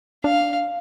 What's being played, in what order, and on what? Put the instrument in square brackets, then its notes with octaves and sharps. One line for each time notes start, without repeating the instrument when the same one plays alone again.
[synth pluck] D4 [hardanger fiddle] F5